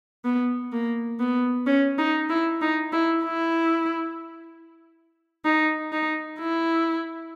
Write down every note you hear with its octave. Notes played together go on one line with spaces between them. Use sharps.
B3
A#3
B3
C#4
D#4
E4
D#4
E4
E4
D#4
D#4
E4